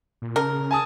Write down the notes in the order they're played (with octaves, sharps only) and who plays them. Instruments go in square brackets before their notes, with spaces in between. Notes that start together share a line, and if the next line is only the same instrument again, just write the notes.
[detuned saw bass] A#2
[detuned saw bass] C#3 [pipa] A#4
[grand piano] G#5 A5 D#6